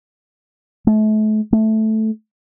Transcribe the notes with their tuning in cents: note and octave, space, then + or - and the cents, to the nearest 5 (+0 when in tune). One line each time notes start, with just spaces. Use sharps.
A3 -35
A3 -5